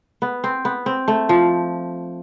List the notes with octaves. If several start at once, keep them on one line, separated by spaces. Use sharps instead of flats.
B3
C4
B3
C4
A3
F3